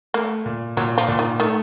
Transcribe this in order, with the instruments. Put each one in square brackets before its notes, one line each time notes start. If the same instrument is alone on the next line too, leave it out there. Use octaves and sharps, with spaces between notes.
[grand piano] A3 [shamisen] A#3
[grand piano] A#2
[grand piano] A#2 [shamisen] F#3
[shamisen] F3
[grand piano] A#2
[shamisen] D#3
[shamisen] D#3 [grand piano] A3